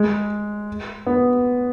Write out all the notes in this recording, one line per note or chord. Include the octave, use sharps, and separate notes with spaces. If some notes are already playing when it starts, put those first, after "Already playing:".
Already playing: G#3
B3